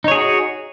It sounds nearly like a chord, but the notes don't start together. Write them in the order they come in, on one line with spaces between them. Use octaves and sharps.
D#4 C#5 G#4 F#4